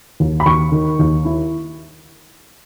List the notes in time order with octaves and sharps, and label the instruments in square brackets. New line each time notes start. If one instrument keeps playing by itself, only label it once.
[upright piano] D#2
B5
D#2 C#6
D#3
D#2
E4